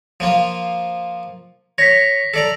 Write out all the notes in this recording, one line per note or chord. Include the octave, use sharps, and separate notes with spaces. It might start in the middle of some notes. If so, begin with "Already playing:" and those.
F3 A#3 F4
C#5 A#6 B6
A4 D5 A#5